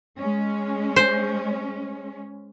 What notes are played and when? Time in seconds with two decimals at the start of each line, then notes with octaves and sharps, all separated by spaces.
0.19 G#3 C#4
0.96 C5